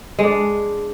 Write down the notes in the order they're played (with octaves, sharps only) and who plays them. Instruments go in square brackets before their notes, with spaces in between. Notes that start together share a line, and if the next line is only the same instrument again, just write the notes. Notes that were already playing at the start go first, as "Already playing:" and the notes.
[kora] G#3 D4